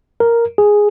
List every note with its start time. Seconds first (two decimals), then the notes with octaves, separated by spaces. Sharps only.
0.20 A#4
0.58 G#4